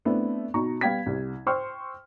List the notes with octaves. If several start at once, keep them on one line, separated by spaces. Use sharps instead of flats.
A3 B3 C4 D4 E4
B2 D#4 A#5 C#6
G3 B3 F5 G5 G#6 B6
C2 C3
C5 G5 C6 C#6 E6 F6